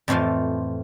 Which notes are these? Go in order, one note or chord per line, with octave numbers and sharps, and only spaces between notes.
F2 A2 E3 F3 F4